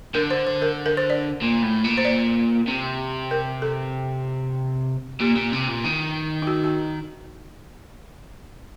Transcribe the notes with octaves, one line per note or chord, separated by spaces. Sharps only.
D3 A#4
C5
C5
A#4
A#4
C5
D5
A#2
A2
A#2
C5
D5
C3
A#4
A4
A#2 G4
A#2
C3
A#2
D#3
D#4
F#4
F#4